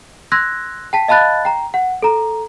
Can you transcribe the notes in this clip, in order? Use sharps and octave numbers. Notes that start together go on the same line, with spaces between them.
C6 E6 F#6 G#6 A#6
G5 A5 B6
D#5 F5 A5 B5 F#6 A6
G5 A#5
F#5
A4 A#5